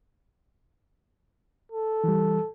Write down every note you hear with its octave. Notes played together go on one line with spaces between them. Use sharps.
A4
E3 G3